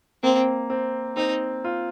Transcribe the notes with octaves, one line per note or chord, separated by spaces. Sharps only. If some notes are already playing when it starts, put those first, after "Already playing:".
A#3 C4
C4
C4 D#4
F4